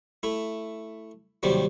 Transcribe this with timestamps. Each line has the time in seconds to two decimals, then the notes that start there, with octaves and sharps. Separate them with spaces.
0.23 A3 E4
1.43 D#2 C3 D#3 F#3 G3